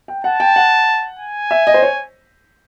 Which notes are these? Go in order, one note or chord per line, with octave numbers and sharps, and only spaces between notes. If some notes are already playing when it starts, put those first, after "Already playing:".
G5
F#5 A5
G5
F#5
G#5
E5
D#5
C5
C#5